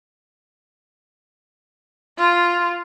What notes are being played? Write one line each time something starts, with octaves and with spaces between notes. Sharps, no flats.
F4